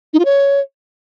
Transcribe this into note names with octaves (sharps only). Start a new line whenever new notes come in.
D#4
F4
C#5